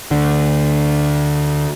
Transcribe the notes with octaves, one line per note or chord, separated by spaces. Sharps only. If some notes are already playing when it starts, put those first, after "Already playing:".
D2 D3